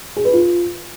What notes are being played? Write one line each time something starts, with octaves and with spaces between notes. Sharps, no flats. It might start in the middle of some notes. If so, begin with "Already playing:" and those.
G#4
B4
F4